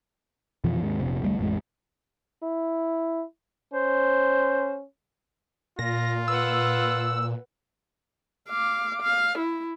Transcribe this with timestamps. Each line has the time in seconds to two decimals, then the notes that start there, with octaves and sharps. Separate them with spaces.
0.64 F2 B2 E3 F3
0.79 D#2 G#2
1.00 F1 A#1 C3
1.22 F1 D2 G3 A3
1.39 A1 F2 G#3
2.43 E4
3.73 C#4 C5
5.79 A#2 F4 A#6
6.28 B4 F#5 E6
8.49 F5 D6
9.02 F5
9.38 E4